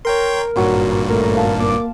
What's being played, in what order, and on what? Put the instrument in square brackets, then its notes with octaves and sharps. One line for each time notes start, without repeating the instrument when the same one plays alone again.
[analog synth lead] A#4 [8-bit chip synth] C#5 G5 C6
[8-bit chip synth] G#1 G2 A#2 [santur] F#3 C6
[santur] D6
[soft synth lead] A3 [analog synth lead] A#4
[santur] E5 F5 A5
[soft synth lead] A#3 [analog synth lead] D6